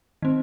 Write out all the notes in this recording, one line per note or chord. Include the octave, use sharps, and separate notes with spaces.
D#3 C4